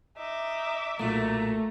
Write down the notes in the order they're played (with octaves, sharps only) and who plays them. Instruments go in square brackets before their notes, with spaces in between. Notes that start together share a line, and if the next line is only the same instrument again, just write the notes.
[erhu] D#4 [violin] E5 D6
[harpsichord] B1 A#2 [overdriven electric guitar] A3 [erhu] A#5